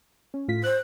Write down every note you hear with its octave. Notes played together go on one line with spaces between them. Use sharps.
C#4
A2 F4 B6
C5 F#6